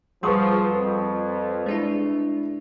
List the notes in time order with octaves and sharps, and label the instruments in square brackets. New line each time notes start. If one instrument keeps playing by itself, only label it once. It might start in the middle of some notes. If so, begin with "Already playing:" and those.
[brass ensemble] F3 [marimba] G3 F4 G#4 [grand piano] B4 C#6 D#6 [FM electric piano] C6
[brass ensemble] F2
[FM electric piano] G#3 D4 E4